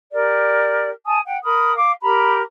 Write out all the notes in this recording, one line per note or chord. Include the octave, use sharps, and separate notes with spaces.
G4 A#4 D5
G#5 A5 D#6
F#5 G5
A#4 B5 D#6
F5 D6
G4 A#4 A#5 B5